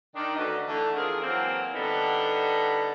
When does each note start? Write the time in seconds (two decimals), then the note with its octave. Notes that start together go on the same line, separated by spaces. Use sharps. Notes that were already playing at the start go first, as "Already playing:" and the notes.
0.15 D#3 D4
0.36 D2 D3 C#4 D4 B4 D#5
0.66 D3 E3 A3
0.96 E3 F3 C4 G#4 A#4
1.22 E3 F#3 A#3 C4
1.75 D3 G3 B3 D#4 A4